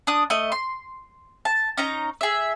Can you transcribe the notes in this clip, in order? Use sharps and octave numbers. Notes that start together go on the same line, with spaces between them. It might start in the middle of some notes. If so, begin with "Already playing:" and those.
D4 D#6
A3 D#5
C6
A5
C#4 D#4 A#5
G#4 E5